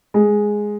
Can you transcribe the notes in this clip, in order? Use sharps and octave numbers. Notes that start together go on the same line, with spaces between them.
G#3